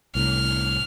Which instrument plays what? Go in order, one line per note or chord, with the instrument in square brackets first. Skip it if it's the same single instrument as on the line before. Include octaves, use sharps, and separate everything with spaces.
[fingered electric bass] C2 A2 [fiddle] F6